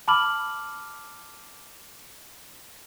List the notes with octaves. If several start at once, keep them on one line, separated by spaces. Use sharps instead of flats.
A5 B5 D6 F6 F#7